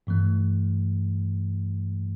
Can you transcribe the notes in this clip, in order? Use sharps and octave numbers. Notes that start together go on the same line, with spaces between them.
G2 E3 A3